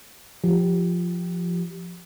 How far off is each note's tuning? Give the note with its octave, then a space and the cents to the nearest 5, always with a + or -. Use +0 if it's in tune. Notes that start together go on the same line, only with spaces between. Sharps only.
F3 +0 G4 +0